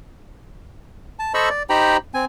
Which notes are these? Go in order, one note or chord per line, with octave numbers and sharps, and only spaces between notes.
A5
A4 C5 D#5 B5 C#6 E6
D5
D#4 G4 C5 G5 A#5 B5
C4 G#5